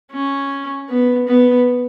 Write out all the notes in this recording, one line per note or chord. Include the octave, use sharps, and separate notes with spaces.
C#4
B3
B3